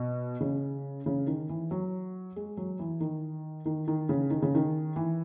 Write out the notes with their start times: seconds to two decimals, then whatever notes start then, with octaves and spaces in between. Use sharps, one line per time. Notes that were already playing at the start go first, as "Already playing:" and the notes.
Already playing: B2
0.41 C#3
1.06 C#3
1.27 D#3
1.49 E3
1.71 F#3
2.36 G#3
2.57 F#3
2.79 E3
3.00 D#3
3.66 D#3
3.88 D#3
4.09 C#3
4.30 D#3
4.42 C#3
4.55 D#3
4.96 E3